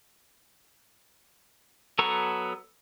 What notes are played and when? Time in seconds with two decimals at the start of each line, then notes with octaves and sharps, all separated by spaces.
1.99 F#3 B3 A4 A#5 C#6